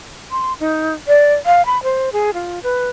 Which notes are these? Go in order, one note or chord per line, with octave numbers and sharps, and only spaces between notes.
C6
D#4
D5
F5
B5
C5
G#4
F4
B4